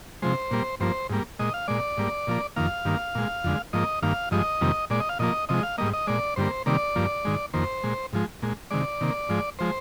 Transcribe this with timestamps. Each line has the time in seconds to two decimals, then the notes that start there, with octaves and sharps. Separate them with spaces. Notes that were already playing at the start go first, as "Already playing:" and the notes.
0.22 C3 F3 G#3 C5
0.51 A#2 G3 A#3
0.80 G2 F3 A#3 C5
1.10 G#2 G3 A#3
1.39 A#2 G#3 D#5
1.54 F5
1.68 A#2 G#3 D5
1.97 G#2 G3 A#3
2.27 A#2 F3 A#3
2.56 F2 D#3 A#3 F5
2.85 G2 D#3 A#3
3.15 A#2 G#3
3.44 F2 D3 G#3
3.73 G#2 F3 A#3 D#5
4.02 G2 D#3 A#3 F5
4.31 G2 F3 G#3 D#5
4.61 F2 C3 D#3 G3 A#3
4.90 A#2 G#3 D5
5.00 D#5
5.09 F5
5.19 A#2 F3 A#3 D#5
5.49 C3 F3 G#3 D#5
5.63 F5
5.78 G#2 G3 A#3 D#5
5.93 D#5
6.07 A#2 G#3 D5
6.36 G2 D3 G3 A#3 C5
6.66 C3 D#3 G3 A#3 D5
6.96 G2 F3 A#3
7.25 G#2 D#3 G#3
7.54 F2 D#3 A#3 C5
7.83 A#2 G#3
8.13 G#2 F3 G#3
8.42 A#2 G#3
8.71 C3 D#3 G#3 D5
9.01 C3 D#3 A#3
9.29 G#2 F3 G#3
9.59 F3 G#3 C5